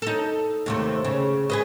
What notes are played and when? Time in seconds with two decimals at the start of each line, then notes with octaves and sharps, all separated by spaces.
0.02 D#4 A4
0.66 D#2 C3 A3
1.05 C#3
1.50 G#4 B4 D#5